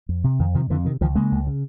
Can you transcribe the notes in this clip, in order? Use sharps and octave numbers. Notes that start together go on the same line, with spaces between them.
F2
C3
F2 D#3
C3 D#3 F3
F2 D3 E3
C3 D#3
C#2 D#3 F3
C#3 G#3 A#3
C#2
C#3